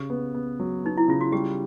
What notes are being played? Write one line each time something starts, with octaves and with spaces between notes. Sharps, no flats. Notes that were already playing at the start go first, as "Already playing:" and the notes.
Already playing: C#3 G4
B3
B3
F#3
B3 D#4
E4
C#3 F4
F#4
G3 G4